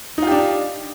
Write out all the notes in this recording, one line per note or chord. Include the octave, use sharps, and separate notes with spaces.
D4 D#4 F4 G4